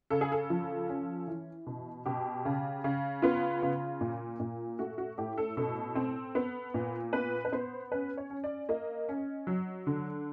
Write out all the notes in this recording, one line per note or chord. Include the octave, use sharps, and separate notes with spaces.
C#3 A4
G#4
A4
F3
C#4
E3
B2
B2 G4
C#3
C#3
B3 F4
C#3
A#2
A#2
A3 F#4
F#4
A2 G4
A4
B2 A4
C4
B3
A#2
B3 B4
B4
B3 C5
C#4 B4
C#5
C#4
D5
A#3 D#5
C#4
F#3
D3